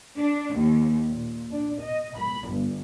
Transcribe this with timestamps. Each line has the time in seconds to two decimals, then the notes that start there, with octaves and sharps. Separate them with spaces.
0.17 D4
0.54 D#2
1.08 A#2
1.51 D4
1.81 D#5
2.17 B5
2.49 G1